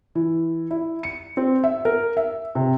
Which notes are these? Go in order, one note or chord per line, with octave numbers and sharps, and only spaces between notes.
E3
E4
C#7
C4
E5
A#4
E5
C3